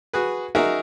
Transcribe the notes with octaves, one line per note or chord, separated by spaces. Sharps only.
F#4 G#4 B4
D#4 F#4 G#4 A#4 E5